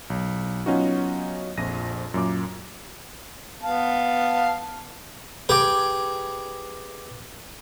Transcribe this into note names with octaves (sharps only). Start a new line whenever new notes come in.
B1
F#3 B3 C#4 D#4 F4 F#4
A#1 F2 A#6 D#7
F#2 A#2 D6
B3 F5 A5
G4 G#4 B4 G5 D6